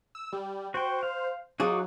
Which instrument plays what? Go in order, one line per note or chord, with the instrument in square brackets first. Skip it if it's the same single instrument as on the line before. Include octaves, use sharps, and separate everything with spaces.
[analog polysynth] E6
G3
[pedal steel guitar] F#4 G5 [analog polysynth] C5
[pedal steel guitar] F5
[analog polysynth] F#3 [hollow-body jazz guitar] D#4 F4 G#4 [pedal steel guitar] F#4 D6 D#6